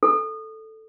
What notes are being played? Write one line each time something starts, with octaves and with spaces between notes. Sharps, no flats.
A4